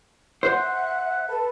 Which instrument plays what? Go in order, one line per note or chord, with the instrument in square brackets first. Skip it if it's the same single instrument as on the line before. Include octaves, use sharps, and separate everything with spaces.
[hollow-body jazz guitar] C5 [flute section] E5 F#5 F#6
[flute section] A4 B4